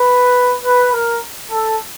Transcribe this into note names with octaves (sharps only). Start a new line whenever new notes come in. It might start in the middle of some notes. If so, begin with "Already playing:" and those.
Already playing: B4
B4
A#4
A4